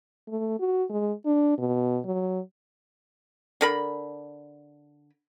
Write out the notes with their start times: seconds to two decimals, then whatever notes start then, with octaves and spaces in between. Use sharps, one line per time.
0.28 A3
0.60 F#4
0.90 G#3
1.26 D4
1.58 B2
2.05 F#3
3.61 D3 A#4 B5